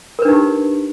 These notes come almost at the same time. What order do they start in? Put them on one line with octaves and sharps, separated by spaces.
A#4 B4 D4 D#4 G4